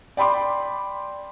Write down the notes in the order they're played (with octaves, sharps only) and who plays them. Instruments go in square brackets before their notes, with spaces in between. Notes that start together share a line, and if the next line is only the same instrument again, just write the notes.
[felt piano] D5 G5 B5 C6 D6